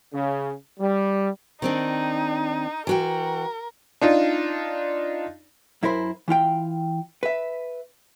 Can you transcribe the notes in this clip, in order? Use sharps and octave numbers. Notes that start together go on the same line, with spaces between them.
C#3
G3
D#3 C4 D4 D#4
E3 F#4 A#4 G5
D4 D#4 F4
F#2 E4 A#4 C5 B5
E3 E4 F4 G5
B4 E5